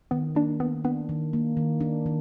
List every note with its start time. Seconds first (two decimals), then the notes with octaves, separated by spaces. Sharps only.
0.11 D#3 B3
0.35 A#3 D4
0.60 D#3 B3
0.84 B3 D4
1.09 D#3
1.33 A#3
1.57 D#3
1.81 D4
2.06 D#3